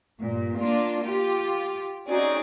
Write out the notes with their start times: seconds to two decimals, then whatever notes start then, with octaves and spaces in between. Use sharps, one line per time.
0.21 G2 A#2
0.59 A#3 D4 F4
1.04 F4 G4
2.08 C4 C#4 D#4 F#4 G#4 D5